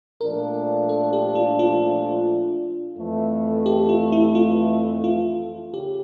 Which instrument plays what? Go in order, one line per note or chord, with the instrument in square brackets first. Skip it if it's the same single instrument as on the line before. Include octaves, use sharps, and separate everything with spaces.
[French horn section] A#2 F3 A3 D4 [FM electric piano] A#4
[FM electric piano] A4
G4
F4
F4
[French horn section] F2 E3 A3
[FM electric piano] G4
F4
E4
F4
F4
[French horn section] C#3 [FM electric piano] G4